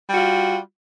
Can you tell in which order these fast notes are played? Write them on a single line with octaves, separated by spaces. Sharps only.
G3 F#4 F4